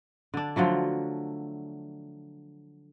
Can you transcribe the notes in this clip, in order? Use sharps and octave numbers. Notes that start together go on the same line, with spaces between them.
D3 D4
D3 F3 F#3 A3